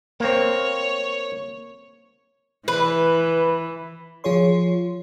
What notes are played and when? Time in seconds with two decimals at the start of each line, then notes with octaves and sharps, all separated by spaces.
0.20 A#3 C4 C#5
2.68 E3 B4
4.24 F3 F4 G#4 C#5 C6